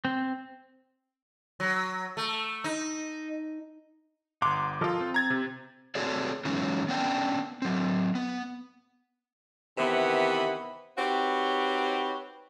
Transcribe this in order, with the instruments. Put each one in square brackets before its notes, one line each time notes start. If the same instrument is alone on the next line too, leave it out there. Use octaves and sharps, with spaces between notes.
[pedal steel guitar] C4
[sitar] F#3
A3
D#4
[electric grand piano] G1 D6 [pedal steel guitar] F#5 A#5 C6
[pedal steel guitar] F3 A#4 D#5 [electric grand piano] F4 A4
[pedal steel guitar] C4
[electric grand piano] A#5 G#6 A6
C3
[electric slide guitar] C4 F#4 G#4 A4 C#5 D5
E3 F#3 G#3 B3 C#4 D#4
B3 C#4 D4 G5
F#3 C4
B3
[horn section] C3 D#3 E3 B3 F#5 B5
C4 D#4 F#4 G4 B4 C#5